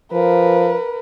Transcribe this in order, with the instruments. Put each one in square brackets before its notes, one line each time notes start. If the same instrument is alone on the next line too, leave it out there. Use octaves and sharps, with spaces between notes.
[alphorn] F3 [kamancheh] A#4 B4